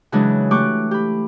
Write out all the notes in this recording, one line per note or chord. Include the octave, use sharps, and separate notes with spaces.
C#3 E3 F#3 G#3 D4
A3 G4 C#6 D6 F#6
G4 B5